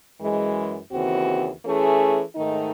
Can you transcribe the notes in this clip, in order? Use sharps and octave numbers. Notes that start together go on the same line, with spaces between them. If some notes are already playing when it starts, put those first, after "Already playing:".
F#2 E3 G#3
D#2 C#3 E3 C4 F#4
E3 A3 C#4 G#4
G#2 D#3 A3 D#4